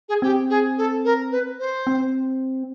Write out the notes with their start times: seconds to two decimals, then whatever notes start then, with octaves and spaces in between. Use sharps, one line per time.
0.09 G#4
0.22 C4 G4
0.50 G#4
0.78 A4
1.05 A#4
1.31 B4
1.59 C5
1.87 C4